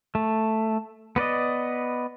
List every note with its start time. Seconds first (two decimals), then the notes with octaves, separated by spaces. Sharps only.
0.15 A3
1.16 B3 B4 D5 D#5